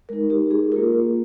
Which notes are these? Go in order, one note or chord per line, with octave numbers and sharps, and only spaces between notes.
G#3 D#4 A#4
G4
G#4
A#3 F4 A#4